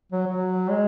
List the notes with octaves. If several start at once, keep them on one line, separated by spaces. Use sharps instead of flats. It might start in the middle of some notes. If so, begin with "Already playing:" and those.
F#3
F#3
G#3